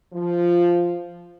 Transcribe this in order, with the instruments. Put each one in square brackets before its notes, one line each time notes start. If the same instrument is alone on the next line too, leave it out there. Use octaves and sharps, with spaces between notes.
[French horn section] F3